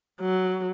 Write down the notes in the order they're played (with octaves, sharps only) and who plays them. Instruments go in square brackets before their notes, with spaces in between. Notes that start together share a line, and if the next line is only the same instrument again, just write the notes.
[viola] F#3